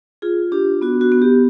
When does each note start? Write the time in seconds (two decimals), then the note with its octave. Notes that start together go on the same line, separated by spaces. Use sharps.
0.22 F4 G#4
0.52 D4 G4
0.82 B3 F#4
1.01 F#4
1.12 B3
1.22 G4